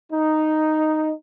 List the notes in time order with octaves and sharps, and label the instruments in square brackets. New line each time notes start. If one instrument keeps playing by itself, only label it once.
[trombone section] D#4